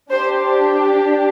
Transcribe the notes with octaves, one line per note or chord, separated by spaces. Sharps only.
D4 G4 C5